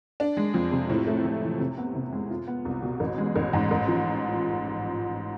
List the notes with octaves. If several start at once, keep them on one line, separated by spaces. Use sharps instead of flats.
D4
G#3
F2
C3
A2
A3
A2
E3
C3
B3
C3
G#3
F4
B3
C2
B2
A1
G#3
A1
G#2
A1
F3